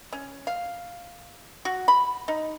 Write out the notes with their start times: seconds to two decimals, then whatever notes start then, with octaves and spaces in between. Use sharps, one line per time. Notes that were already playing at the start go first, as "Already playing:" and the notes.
0.13 C#4
0.47 F5
1.65 F#4
1.88 B5
2.28 D#4